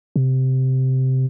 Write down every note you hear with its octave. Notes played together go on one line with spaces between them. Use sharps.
C3